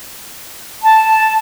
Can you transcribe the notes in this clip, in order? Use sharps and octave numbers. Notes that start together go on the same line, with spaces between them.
A5